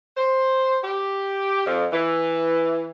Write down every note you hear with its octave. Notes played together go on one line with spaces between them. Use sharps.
C5
G4
F2
E3